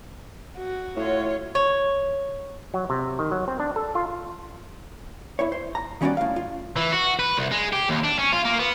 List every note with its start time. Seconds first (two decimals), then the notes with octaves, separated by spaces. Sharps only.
0.58 F#4
0.97 A2 F4 C#5
1.55 C#5
2.74 F#3
2.90 C3
3.19 D#3
3.31 F#3
3.48 C4
3.60 D4
3.76 A4
3.95 F4
5.39 E4 C#5
5.52 C5
5.75 A#5
6.01 D#3 G3 C#4 D4 F#4 D5
6.17 A2 F5
6.36 F4
6.76 E3
6.92 F#4
7.19 B4
7.38 C2
7.52 G#3
7.73 G4
7.89 D#2
8.04 D4
8.19 C#4
8.33 F4
8.45 A#3
8.59 B3